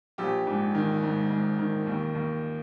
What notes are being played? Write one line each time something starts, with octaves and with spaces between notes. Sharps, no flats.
A#1 G4
G#2
D#3
G#2
G#2
D#3
D#2
D#2